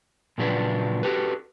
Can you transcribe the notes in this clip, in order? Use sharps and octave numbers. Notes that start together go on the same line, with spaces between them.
A#2 C#3 F3 F#3 D4 B4
F#4 G4 A4 B4